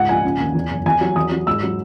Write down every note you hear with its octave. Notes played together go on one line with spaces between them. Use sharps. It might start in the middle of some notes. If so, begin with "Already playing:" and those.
Already playing: C#2 G#2 F#5
A#1 G#5
C#3
D#2
E2
F#1
E2 G#5
F#3
E2 D#6
F#3
G#2 E6
F#3